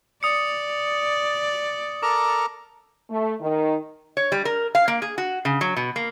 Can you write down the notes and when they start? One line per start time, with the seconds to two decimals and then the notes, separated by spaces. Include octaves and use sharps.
0.23 D5 D#6 C#7
2.03 A4 A#4 A#5 D6
3.10 A3
3.41 D#3
4.17 C#5
4.32 G3
4.45 A#4
4.75 F5
4.88 A#3
5.02 G#4
5.18 F#4
5.45 C#3
5.61 F#3
5.77 B2
5.96 A#3